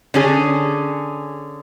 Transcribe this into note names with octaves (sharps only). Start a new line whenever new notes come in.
D3 C#4 G#4